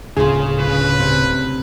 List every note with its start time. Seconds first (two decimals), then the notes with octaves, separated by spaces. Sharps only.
0.17 D1 C#3 F4 G#4
0.60 B4
0.99 C3